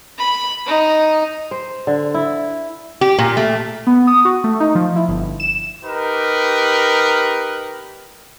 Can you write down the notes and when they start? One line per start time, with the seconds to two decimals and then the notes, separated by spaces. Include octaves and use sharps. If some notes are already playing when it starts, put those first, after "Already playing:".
0.18 B5
0.67 D#4
1.51 C5
1.87 D3
2.14 E4
3.01 G4
3.18 A#2
3.37 A3
3.87 B3
4.07 D#6
4.25 F#4
4.44 A3
4.60 D#4
4.75 F3
4.96 E4
5.08 G1
5.40 E7
5.85 D#4 G4 A#4 B4